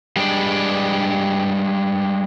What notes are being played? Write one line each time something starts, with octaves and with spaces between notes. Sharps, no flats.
G3 G#3 D4 D5